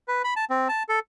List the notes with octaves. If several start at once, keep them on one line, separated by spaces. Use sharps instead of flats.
B4
B5
A5
C4
A5
A4